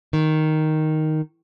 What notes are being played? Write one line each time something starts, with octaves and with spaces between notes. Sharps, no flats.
D#3